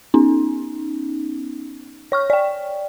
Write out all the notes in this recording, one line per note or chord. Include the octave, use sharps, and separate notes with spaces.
B3 C#4 D#4
C#5 C#6 F6
D5 G5